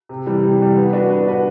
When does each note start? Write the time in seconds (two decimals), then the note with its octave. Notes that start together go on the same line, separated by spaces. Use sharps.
0.09 C3
0.26 E3 G3
0.43 C3
0.60 E3 G3
0.76 B3
0.93 D4 F#4 B4
1.10 B3
1.26 D4 F#4 B4